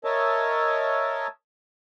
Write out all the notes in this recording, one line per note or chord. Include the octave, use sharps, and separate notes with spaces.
A#4 C#5 D#5 E5 A5